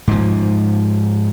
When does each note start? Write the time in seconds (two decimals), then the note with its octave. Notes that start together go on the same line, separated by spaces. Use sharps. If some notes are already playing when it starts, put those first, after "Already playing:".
0.07 G#2 F3